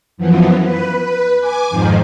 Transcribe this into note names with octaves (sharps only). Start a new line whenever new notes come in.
F#2 E3 F3 B3
B4
B4
G#5 D6
F2 G#2 D#3 F3